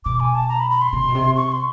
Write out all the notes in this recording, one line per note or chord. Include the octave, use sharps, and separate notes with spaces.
B2 D6
G#5
A5
A#5
B5
B5
C6
C3
B2
C3
C#6
C6